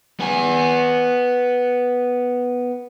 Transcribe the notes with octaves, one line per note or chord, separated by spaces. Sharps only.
B3 G#5